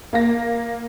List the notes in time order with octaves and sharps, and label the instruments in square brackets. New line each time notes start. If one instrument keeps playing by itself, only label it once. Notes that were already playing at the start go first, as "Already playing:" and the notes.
[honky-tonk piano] A#3 F5 A#6